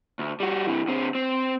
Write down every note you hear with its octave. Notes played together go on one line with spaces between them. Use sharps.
D2
G3 F#4
C3 E3
D3 C4
C4